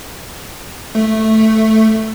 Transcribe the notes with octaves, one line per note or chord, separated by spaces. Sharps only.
A3